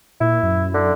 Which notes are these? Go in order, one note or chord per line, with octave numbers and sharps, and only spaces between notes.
A#2 E4
F#2
D3